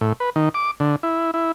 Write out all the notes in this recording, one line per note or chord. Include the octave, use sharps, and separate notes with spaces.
A2
B4
D#3
D6
D3
E4
E4